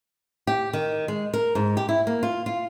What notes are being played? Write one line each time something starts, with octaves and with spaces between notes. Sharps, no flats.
G4
D#3
G#3
A#4
G#2
G4
E4
A#3
F4
F4